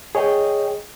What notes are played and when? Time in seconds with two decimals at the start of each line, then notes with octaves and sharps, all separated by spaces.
0.15 G#4 C#5 D#5 G5